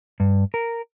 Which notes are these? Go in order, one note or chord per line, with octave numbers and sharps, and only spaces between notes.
G2
A#4